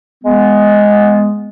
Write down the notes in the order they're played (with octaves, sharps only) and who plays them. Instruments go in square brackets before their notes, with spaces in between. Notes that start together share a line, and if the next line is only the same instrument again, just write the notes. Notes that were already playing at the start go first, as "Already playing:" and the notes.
[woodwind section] G#3 B3